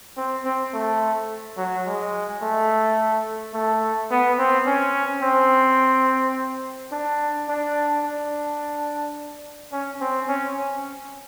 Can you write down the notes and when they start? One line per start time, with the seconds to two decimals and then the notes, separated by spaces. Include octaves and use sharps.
0.17 C4
0.45 C4
0.74 A3
1.57 F#3
1.86 G#3
2.42 A3
3.54 A3
4.11 B3
4.38 C4
4.67 C#4
5.23 C4
6.92 D4
7.48 D4
8.04 D4
9.72 C#4
10.01 C4
10.28 C#4